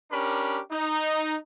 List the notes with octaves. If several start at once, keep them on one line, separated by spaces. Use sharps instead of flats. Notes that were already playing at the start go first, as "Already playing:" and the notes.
C#4 D4 G4 A#4 B5
D#4